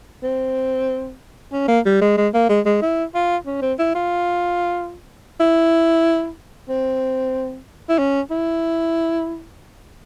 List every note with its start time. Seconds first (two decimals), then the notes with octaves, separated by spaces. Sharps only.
0.23 C4
1.53 C#4
1.68 A#3
1.85 G3
2.01 G#3
2.17 G#3
2.34 A#3
2.49 G#3
2.66 G#3
2.82 E4
3.14 F4
3.46 C#4
3.62 C4
3.79 E4
3.95 F4
5.40 E4
6.69 C4
7.89 E4
7.99 C#4
8.31 E4